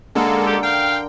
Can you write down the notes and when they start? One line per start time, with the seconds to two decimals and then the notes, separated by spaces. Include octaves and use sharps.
0.15 D3 G#3 A#3 A4 A#4
0.46 G4
0.63 F5 G5